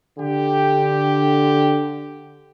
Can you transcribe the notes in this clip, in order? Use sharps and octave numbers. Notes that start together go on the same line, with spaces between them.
D3 G4